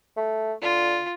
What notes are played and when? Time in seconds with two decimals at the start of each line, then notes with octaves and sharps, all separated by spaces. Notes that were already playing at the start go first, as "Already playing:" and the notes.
0.17 A3
0.62 D3 F4